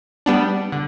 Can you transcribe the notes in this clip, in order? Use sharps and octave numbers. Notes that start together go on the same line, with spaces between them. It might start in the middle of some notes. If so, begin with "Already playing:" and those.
G3 B3 D4
D3